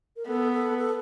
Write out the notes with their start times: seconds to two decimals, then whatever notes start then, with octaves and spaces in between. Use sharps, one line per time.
0.16 A#4
0.27 B3 A4
0.53 A4
0.78 A4